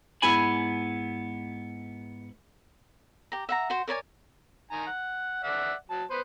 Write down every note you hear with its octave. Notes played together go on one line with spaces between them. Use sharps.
G#2 B3 E4 G#4 G#5 B5
G4 A#5
E5 F#5 A#5
F#4 C5
A#4 C#5 D5 G#5
D#3 G#5 A#5
F#5
D5 E5 F#5
F#3 A5
B3 B4 C5